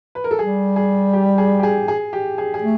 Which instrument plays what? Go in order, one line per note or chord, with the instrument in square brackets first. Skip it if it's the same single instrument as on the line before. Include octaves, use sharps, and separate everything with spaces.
[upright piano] B4
A#4
A4
[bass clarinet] G3 [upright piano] G#4
[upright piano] G#4
G4
G#4
G4
G#4
G#4
G4
G#4
G#4
[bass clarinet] A3